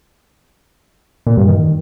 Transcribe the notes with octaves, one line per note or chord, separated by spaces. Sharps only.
A#2
G2
D#3